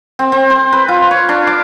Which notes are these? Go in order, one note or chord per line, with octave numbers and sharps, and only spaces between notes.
C4
C4
C5
B4
F4
C#5
D4
D6